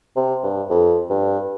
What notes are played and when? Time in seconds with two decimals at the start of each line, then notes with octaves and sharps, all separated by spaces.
0.17 C3
0.44 G2
0.70 F2
1.10 G2